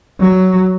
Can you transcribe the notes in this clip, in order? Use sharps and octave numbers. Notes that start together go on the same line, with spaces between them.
F#3